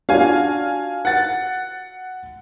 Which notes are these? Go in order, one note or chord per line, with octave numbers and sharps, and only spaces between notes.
D4 F4 F#4 F5 G#5
F#5 A6